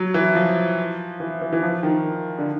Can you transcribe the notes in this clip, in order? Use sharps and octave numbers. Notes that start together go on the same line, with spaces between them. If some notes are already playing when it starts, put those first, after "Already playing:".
Already playing: F#3
E3
F3
E3
E3
E3
F3
D#3
D3